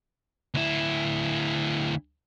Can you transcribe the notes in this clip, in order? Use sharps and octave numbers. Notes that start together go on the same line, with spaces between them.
D2 E4